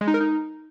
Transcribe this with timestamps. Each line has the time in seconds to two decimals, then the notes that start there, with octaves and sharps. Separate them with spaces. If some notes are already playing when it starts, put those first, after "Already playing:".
0.01 G#3
0.07 D#4
0.14 A#4
0.21 D#4